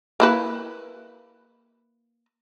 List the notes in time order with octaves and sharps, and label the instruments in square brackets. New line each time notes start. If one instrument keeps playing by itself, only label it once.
[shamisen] A#3 E4 B4